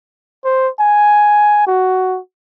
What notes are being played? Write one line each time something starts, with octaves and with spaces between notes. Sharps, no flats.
C5
G#5
F#4